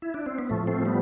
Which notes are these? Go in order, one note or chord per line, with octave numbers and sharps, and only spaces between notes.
E4
D4
C4
B3
A2 F3 A3
A3 C4
G3 B3